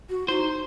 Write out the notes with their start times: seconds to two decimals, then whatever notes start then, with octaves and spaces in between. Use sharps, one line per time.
0.10 F#4
0.28 D#4 E4 C5